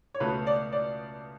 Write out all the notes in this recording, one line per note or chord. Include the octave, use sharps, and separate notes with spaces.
C#5
C#2 B2 A3 B4
D5
D5